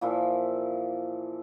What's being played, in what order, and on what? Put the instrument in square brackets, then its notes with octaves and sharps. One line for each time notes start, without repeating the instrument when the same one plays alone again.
[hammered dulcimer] A#2 E3 F3 E4